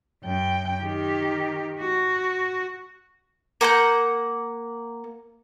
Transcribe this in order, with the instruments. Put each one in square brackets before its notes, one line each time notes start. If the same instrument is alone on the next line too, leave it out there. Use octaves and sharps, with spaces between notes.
[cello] F#2 G5
D#3 G4
F#4
[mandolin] A#3 F#5 B5 G6